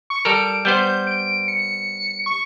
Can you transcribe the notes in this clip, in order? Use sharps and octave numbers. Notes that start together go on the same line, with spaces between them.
C#6
G3 A4 A#4 D7
G3 B3 C5 G6
D7
C#7
C#6